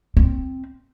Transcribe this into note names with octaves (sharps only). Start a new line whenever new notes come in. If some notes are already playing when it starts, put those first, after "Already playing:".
C4